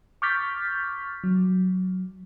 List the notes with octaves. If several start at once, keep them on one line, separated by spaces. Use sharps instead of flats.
C#6 D6 F6 G6 A6 B6
F#3